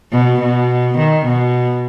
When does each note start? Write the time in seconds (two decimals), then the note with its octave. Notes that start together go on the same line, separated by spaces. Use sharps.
0.12 B2
0.41 B2
0.97 D#3
1.26 B2